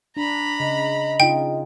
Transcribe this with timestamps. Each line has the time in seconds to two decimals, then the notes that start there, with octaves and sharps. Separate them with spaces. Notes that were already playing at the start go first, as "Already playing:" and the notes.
0.17 D4 A#5 B5
0.60 C#3 D#5
1.20 C#3 D#4 F4 G5